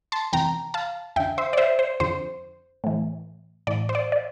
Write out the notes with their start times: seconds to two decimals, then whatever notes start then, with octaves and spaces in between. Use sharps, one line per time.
0.12 A5 C6
0.33 F2 C3 E3 G5 A#5
0.74 F5 A5
1.16 F2 D3 E5 G5
1.38 C5 E5
1.53 D5
1.57 C5 E5
1.79 C5
2.00 F2 D3 C5
2.84 A2 E3
3.67 A2 E3 D5
3.89 C5
3.95 D5
4.12 D5